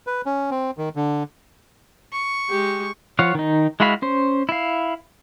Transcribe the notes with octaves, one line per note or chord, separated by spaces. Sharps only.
B4
C#4
C4
D#3
D3
C#6
G#3 G4
F3 C#5 F5 F#5
D#3 D#4
G#3 E4 F#4 F5 B5
C#4 C5
E4 F5